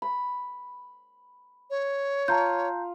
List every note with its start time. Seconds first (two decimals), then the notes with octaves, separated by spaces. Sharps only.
0.02 B5
1.70 C#5
2.28 F4 A5 A#5 G6